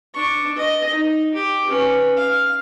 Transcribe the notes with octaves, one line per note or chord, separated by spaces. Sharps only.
D4 C#6
D#5
D#4
G4
C#4 B4
F5